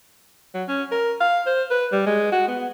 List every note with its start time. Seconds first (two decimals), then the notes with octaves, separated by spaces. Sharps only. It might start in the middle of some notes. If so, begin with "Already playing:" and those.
0.55 F#3
0.68 C#4
0.92 A#4
1.20 F5
1.46 C5
1.71 B4
1.92 G3
2.06 G#3
2.32 F#4
2.48 B3